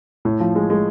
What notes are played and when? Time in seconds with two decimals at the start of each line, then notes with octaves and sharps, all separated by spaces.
0.25 A2
0.40 F3
0.56 G#3
0.70 G#3